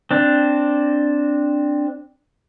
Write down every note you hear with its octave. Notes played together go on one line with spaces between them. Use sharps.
C4 D4